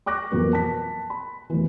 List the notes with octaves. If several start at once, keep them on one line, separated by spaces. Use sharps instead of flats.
C#6 D6 F#6 A#6
F2 B2 E3 F#3 A#3 B4
A5 B6
B5
F1 B2 E3